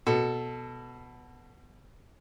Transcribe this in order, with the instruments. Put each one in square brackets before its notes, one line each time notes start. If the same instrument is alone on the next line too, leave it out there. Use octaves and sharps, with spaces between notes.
[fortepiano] B2 [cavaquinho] A4